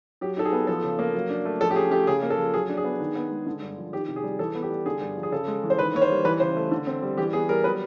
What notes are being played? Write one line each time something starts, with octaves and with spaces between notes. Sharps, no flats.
F#3 G4
D#4 A4
G#4
B3
F3 A4
C#3
A#3
F#3
D4
A3
F3 A4
G4
C#4 G#4
A3 G4
C#3 G#4
A#3
A4
F3
F#3 G#4
D4
G#4
B3
D#3
B3
G#3
D3
G2
F3
D#3 G4
C3
G#4
G3
E3 A4
B3
G4
G3
D3 G#4
G2
F3
G#4
C#3 A4
G#3
E3
C5
D#3 B4
A#3 C#5
C5
G3
E3 B4
C#3 C5
A3
D3
C4
G3
E3 G4
B3 G#4
G3 A#4
F#3 B4